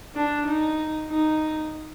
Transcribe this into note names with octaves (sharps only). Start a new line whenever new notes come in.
D4
D#4
D#4